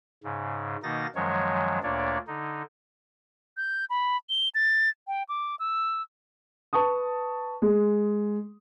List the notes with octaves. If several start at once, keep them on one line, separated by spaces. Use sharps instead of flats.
G#2 C#3
B2 D#3 A#3 D#4 A6 A#6
F#2 D#3 F3 F#3 G#3 C#5
D2 A#2 A#3 D4 C#5 D5
D3 D#4
G6
B5
G7
A6
G5
D6
E6
B4 A5 C#6 D#6
G#3 G#4